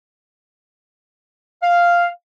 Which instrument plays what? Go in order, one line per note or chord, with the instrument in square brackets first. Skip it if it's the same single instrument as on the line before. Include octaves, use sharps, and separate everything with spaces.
[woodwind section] F5